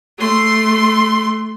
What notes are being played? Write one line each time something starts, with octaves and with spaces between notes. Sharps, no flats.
A3 C6